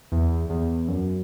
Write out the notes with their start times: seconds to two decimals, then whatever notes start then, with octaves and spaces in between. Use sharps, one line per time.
0.12 E2
0.50 E2
0.88 F#2